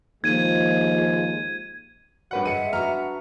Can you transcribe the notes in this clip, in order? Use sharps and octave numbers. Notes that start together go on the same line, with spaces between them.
D#2 F3 G#3 G#6 D#7
G2 F#3 B4 F#5
G2 G#3 E5 F#5 C#7 D#7
B3 D4 F#4 A#5 F6